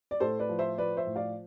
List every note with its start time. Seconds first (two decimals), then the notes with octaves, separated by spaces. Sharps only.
0.11 D5
0.20 A2 A4 C5
0.39 B4 D5
0.49 F3
0.59 C5 E5
0.78 F3 B4 D5
0.97 C5 E5
1.06 A2
1.16 D5 F5